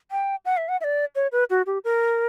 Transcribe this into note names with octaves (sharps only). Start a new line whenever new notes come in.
G5
F#5
E5
F#5
E5
D5
C#5
B4
F#4
G4
A#4